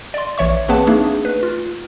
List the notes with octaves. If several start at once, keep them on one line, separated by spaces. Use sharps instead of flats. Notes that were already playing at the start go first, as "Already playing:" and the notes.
D5 C6
A#1 E3 C#5 E5 C#6
A#3 C4 G#4 B4 F#5 A5
A3 A#3 D4 D#4 G#4
B4
F4